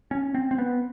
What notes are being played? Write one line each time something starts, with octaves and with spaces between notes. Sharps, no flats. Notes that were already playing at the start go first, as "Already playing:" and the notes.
C#4
C4
C4
B3